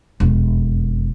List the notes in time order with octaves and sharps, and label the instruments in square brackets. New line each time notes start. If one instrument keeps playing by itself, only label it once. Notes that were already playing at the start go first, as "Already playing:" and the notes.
[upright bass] E1 F2